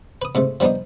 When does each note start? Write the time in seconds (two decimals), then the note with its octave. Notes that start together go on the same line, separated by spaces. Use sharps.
0.22 B4 D#6
0.35 G#2 C3 A3
0.60 F3 G3 B3 D4 D#4